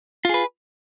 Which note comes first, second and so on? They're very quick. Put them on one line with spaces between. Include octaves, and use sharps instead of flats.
F4 G#4 B4